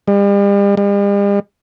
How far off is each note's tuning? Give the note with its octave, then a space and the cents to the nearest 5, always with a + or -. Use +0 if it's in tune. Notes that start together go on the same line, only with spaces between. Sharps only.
G3 +40
G3 +45